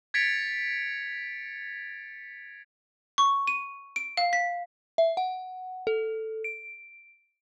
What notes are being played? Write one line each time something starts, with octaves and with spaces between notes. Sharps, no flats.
G#6 A6 B6 C#7 D7 F7
C#6
D#7
D7
F5
B6
E5
F#5
A4
D7